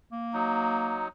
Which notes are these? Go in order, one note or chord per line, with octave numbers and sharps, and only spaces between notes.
A#3
F#3 D#4